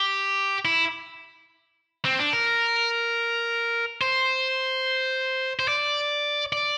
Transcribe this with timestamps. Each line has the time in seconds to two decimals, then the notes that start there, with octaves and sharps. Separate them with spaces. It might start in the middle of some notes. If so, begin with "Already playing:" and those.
Already playing: G4
0.65 E4
2.05 C4
2.19 D4
2.33 A#4
4.01 C5
5.59 C5
5.68 D5
6.53 D5